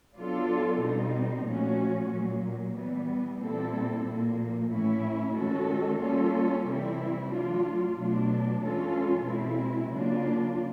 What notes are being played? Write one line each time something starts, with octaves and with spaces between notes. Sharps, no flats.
F#3 B3 D4 F4 A4
B2 G3 C4 D#4
A#2 F3 A3 C#4 F#4
A#2 F#3 A#3
E3 G3 B3
A#2 G3 C4 E4 A4
A#2 F3 A#3
A2 E3 A3 C#4 E4
D#3 G#3 C#4 F#4 A4
G3 A#3 C#4 F4 A4
C3 E3 G3 C4 E4
F#3 A3 D4 F4
B2 F#3 A3 D4
E3 G#3 C#4 F4 A4
B2 G#3 C4 E4
C#3 F#3 A#3 D4 F4